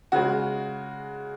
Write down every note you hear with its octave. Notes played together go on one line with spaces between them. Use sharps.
C#3 G#3 F#4